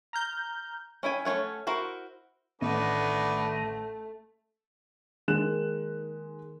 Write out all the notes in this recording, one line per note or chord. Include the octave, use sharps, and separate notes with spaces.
A#5 F6 G6
C#4 E4 G5 G#5
A3 C#4 F4 C#5 F#5
E4 F#4 A#4 C5
A1 D#3 A3 B3 D4
D#3 G#3 F#6 E7